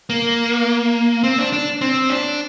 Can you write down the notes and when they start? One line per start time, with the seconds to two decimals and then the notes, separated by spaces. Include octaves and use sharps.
0.10 A#3
1.24 C4
1.38 D4
1.53 D4
1.81 C4
2.09 D4